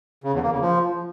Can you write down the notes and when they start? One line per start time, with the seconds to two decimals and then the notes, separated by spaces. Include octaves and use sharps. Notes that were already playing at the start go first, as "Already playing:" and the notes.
0.24 C#3
0.33 E2
0.42 A#3
0.52 C#3
0.61 F3